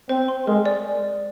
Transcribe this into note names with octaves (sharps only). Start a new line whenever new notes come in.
C4 C5
C6
G#3 A#4
D5